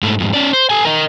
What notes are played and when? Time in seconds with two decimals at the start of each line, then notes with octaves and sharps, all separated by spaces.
0.03 G#2 A3
0.20 F2 G#2
0.34 C#4 D5
0.53 C5
0.70 A4 G#5
0.85 A#4 D#5